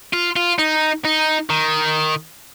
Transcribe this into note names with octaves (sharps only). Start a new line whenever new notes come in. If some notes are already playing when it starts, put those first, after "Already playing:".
F4
F4
D#4
D#4
D#3